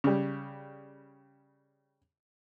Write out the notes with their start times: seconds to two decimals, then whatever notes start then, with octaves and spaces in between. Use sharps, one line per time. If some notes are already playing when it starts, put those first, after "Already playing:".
0.04 C#3 G3